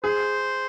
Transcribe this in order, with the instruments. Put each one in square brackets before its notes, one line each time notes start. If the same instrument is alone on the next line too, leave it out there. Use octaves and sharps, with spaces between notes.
[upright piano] G#4 [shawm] C5